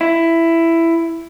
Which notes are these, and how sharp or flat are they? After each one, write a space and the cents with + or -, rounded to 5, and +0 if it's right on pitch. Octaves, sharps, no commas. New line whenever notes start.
E4 +10